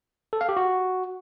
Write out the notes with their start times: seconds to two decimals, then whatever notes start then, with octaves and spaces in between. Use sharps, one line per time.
0.33 A4
0.41 F5
0.49 G4
0.57 F#4